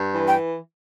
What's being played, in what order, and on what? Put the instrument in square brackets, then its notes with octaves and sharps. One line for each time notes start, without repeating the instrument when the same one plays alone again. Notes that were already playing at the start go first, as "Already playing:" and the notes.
Already playing: [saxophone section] G2
E3
[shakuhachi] G5